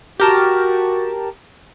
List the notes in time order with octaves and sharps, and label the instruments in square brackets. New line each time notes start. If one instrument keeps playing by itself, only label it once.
[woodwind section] F#4 [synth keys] G4 A#4 A5